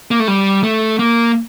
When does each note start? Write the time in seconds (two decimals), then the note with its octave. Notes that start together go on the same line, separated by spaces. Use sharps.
0.11 A#3
0.20 A3
0.28 G3
0.64 A3
0.99 A#3